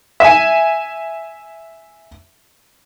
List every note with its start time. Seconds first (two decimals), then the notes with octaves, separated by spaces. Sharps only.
0.20 E5 G#5